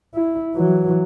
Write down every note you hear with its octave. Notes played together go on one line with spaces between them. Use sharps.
E4
E3 F#3